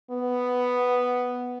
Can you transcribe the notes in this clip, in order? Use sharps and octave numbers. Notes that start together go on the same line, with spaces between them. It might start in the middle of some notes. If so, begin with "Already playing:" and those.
B3